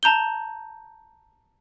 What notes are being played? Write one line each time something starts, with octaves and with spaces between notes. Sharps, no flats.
A5 A#5 G6 G7